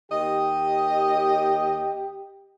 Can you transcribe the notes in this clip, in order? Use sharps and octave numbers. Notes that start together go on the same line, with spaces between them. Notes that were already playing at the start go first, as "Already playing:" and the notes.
D#2 G4 D#5